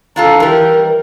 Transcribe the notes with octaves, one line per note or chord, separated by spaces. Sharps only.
D4 F4 A4 A#5
E3 G3 A#4